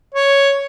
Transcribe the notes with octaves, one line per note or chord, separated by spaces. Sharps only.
C#5